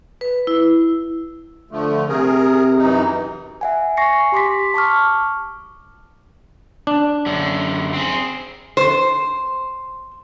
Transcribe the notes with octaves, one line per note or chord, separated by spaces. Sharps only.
B4
E4
D3 F3 A3
C3 G#4 A#4
F#2 E3 D#4
E5 F#5 G#5
G#5 C#6 A#6 C7 C#7
G4 C6 D6 B6
A5 C#6 D6 F6
D4
F#2 D3
C4 G#4
C5